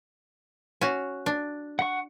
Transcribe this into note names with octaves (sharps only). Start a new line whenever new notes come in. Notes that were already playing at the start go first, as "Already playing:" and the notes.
C#4 F#4
D4
F#5 C#6